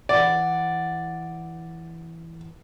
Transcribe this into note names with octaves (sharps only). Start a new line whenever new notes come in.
E3 D5 F#5